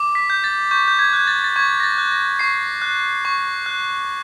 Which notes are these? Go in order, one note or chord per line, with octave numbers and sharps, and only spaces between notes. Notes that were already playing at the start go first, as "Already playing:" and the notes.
Already playing: D6
B6
G6
A6
C#6 G6
G6
G#6
F#6 G#6
A6
A6
C#6 G#6
A#6
A6
F#6
A#6
C#6 C7
F#6
C#6
F#6